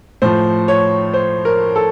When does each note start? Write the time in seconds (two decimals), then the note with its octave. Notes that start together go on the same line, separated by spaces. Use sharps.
0.22 A2 F3 C5
0.68 C#5
1.14 C5
1.45 A#4
1.76 A4